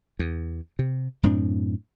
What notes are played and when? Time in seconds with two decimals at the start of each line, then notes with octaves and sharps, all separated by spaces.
0.19 E2
0.79 C3
1.23 F#2 A2 C4 D4